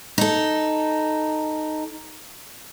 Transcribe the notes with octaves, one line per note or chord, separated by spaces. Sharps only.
D#4 A4